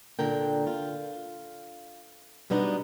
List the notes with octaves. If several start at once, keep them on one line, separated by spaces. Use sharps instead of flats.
A#2 D3 A#4 G5
F4
B2 G3 B3 D4 D#4 D#5